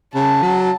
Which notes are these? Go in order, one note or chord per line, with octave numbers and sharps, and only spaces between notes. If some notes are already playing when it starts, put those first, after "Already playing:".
C#3 A5
F#3